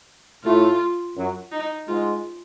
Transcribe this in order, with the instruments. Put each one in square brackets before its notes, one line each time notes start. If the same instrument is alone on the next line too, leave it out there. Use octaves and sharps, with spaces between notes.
[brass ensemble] A2 A3 [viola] F4
[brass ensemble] F#2 F#3
[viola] D#4
[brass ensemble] G#2 G#3 [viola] F4